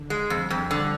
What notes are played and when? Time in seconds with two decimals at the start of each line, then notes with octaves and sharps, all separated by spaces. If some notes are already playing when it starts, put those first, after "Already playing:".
Already playing: D3
0.10 G#3
0.30 F2 G3
0.50 F2
0.60 F3
0.71 D3